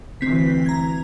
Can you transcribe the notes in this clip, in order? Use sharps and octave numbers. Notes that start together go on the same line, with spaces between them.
D2 E3 C4 B6
A#5 G#6